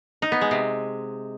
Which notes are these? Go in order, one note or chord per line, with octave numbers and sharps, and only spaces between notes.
D#4
B3
G#3
C3